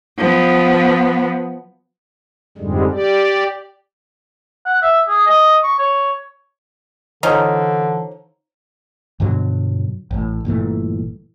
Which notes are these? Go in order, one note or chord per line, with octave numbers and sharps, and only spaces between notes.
F3 B3
F2 G#2 D3 G3 G#3
G4 D5
F#5
E5
G#4
D#5
C#6
C#5
D3 E3 F3 C#4 D#4
G2 B2 D3 F#3
A1 A2
G1 A#2 E3 A3